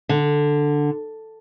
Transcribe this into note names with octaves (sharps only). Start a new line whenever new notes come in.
D3